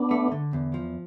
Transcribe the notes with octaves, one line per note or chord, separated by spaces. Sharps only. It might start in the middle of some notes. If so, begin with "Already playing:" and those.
Already playing: B3 D4
A3
D3
E2
F3